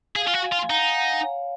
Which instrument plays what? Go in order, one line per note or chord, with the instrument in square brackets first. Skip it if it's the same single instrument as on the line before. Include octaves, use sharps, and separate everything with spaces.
[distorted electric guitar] G#4 [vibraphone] F5 G#5
[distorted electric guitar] F4
F#4
[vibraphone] F5 G#5
[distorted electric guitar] F4
[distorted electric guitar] D#4 [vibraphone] F#5 A#5
[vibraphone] F5 G#5
F#5 A#5
F5 G#5
C#5 F5